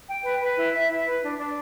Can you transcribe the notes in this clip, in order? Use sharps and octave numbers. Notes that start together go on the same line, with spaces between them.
G5
B4
B4
E4
E5
E4
B4
D4
D4